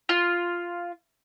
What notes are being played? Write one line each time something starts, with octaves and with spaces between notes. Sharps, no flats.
F4